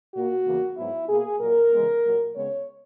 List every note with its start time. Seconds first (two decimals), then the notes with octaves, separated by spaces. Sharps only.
0.13 A#2 A#3 F#4
0.44 E2 C#3 E3 A#3
0.76 G#2 F#3 B3 E4
1.08 B2 A#3 G#4
1.40 A#2 F#3 A#3 A#4
1.71 C#3 E3 G#3 B3
2.03 A#2 F#3 A#3
2.35 C#3 G#3 B3 C#5